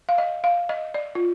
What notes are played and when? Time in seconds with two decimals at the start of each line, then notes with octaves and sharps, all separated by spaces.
0.09 F5
0.18 D#5
0.44 F5
0.69 D#5
0.94 D5
1.15 F4